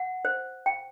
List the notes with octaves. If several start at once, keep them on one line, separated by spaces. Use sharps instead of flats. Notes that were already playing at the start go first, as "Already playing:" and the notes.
Already playing: F#5
C5
G5